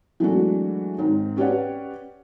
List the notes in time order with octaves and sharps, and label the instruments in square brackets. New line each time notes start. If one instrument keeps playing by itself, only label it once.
[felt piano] E3 F#3 G#3 A3 D4 F#4
G#2 D#3 C4 D#4
C#4 G4 B4 C#5 D5 F#5